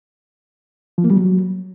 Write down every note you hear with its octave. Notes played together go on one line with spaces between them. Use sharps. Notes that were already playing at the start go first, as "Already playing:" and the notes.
F3
A#3
G3
F#3